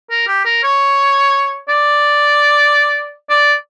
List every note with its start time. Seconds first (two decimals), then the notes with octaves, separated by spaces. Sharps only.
0.10 A#4
0.27 G4
0.45 A#4
0.63 C#5
1.69 D5
3.30 D5